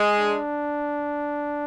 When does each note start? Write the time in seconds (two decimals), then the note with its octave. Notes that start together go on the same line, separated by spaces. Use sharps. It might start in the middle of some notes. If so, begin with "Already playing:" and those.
Already playing: G#3
0.18 D4